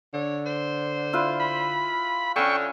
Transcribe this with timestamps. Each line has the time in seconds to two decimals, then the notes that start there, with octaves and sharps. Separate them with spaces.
0.14 D3 C#5
0.46 C5
1.13 E4 F4 B4
1.40 B5
2.36 D3 C#4 G5 G#5 C#6